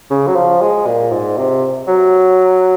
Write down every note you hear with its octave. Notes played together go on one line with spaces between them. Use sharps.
C#3
F#3
F3
G#3
A#2
G#2
C3
F#3